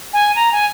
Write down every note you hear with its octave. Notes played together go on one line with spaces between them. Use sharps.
G#5
A#5
G#5